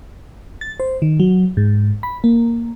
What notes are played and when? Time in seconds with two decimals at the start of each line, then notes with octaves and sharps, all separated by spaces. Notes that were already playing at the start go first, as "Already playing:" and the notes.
0.61 A6
0.80 C5
1.02 D#3
1.20 F#3
1.57 G#2
2.03 B5
2.24 A#3